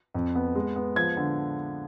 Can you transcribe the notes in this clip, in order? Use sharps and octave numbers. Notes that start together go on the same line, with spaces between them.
F2
B3
G#3
B3
F3 G#6
D3